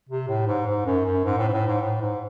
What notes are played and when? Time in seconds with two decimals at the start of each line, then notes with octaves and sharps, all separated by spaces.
0.09 C3
0.28 A2
0.47 G#2
0.67 G#2
0.86 F#2
1.05 F#2
1.24 G#2
1.38 A2
1.48 G#2
1.53 A2
1.67 G#2
1.81 A2
2.01 G#2